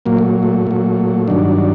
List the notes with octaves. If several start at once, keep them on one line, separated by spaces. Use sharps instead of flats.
A#2 F#3 A#3
A3
A3
A#2 F#3
G2 D#3 F#3 D4